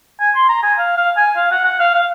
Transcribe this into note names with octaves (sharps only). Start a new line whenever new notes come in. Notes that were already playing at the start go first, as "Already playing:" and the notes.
G#5
C6
A#5
G#5
F5
F5
G#5
F5
F#5
F#5
F5
F5